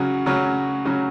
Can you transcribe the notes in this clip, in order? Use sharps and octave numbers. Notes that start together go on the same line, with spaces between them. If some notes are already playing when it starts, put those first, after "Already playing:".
Already playing: C#3 F#3 C#4 F#4
C#3 F#3 C#4 F#4
C#3 F#3 C#4 F#4